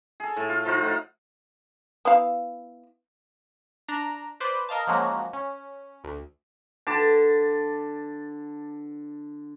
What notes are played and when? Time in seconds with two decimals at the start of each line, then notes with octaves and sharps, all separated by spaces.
0.20 G#4 A4
0.36 A2
0.49 F4
0.65 F3 D#4 F4
0.81 A2 F#5
2.05 B3 E4 F5
3.88 D4 A#5
4.40 B4 C5 D5
4.69 A#4 D#5 F5 A5
4.87 F3 F#3 G#3 A#3 C#4 F#4
5.33 C#4
6.04 D2
6.87 D3 A5 D6